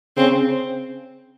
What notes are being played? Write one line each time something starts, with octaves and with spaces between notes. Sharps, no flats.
C#3 C4